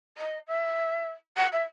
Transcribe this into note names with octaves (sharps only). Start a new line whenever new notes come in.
D#5
E5
F#5
E5